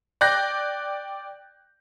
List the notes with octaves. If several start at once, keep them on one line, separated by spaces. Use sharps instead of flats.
D5 G5 F#6 G6 A#6